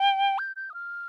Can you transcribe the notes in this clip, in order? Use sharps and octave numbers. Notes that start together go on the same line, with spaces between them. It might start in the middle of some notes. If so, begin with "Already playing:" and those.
Already playing: G5
G6
G6
D#6
F6